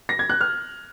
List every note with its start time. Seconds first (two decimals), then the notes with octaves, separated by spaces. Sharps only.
0.09 A#6
0.19 G#6
0.29 F#6
0.41 F6